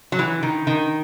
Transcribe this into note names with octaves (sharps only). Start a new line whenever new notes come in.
F#3
E3
D#3
D#3